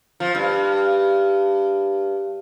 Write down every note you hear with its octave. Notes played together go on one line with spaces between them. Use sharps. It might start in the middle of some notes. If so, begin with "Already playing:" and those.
F3
G2